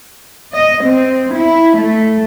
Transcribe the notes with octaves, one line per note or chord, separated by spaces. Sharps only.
D#5
C4
E4
A3